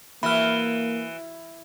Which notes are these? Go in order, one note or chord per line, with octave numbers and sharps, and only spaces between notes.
E3 A#3 F#4 E5 B5 F6